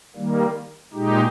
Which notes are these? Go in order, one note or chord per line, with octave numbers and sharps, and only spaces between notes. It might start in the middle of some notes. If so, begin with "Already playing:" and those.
D#3 G3 A#3
A#2 G#3 D#4 G4